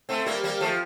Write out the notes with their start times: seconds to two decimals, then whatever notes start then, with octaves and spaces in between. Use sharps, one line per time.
0.09 A3 C4
0.26 G3 A#3
0.44 G3 A#3
0.61 F3 A3